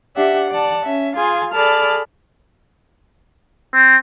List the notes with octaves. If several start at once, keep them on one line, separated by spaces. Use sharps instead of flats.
D4 G4 E5 F#5
D5 F#5 A5
C#4 E5
F4 G#4 F5 G#5 C6
G#4 A4 D5 A5 B5 F6
C4